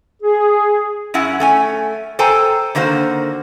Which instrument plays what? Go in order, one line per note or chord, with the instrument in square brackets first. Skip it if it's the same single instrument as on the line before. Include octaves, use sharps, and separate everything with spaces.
[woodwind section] G#4
[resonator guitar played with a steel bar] F#2 C#4 E4 F#5
A3 C#4 G#5
A4 C5 G5 G#5 A#5
D3 D#3 A#3 F#4 C5